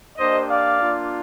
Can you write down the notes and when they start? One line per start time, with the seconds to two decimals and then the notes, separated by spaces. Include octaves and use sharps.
0.17 A#3 D4 G4 C5 D#5
0.49 D5 F5
0.80 A#3 D4 F4